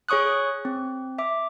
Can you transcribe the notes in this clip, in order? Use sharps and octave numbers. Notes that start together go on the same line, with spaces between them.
G#4 C#5 C#6 D#6 F#6
C4
E5 D6